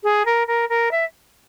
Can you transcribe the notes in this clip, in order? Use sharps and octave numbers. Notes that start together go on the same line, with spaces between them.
G#4
A#4
A#4
A#4
E5